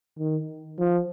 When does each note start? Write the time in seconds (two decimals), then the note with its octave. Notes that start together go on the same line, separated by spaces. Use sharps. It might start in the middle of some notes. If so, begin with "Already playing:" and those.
0.19 D#3
0.79 F3